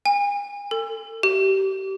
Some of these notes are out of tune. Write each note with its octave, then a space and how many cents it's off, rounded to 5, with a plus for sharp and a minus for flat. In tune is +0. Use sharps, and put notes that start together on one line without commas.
G#5 -40
A4 +30
G4 -30